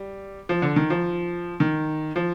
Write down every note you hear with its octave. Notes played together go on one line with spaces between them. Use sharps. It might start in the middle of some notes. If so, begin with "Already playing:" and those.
Already playing: G3
F3
D3
D#3
F3
D#3
F3